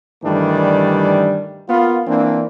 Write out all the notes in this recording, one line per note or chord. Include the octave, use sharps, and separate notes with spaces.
G2 D#3 E3 G3 A3 D4
A#3 B3 F4
E3 A#3 C4 D4